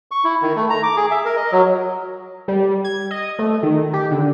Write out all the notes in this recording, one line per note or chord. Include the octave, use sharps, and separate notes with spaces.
C#6
E4
D#3
A3
A#5
D6
G#4
E5
A#4
D#5
F#3
G3
G#6
D#5
A3
D#3
G4
D3